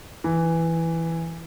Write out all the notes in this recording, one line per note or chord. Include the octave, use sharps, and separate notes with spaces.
E3